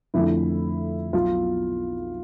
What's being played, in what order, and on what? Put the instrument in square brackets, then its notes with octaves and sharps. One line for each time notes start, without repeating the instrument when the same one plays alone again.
[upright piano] F2 D3 A3 E4
B1 B2 B3 F4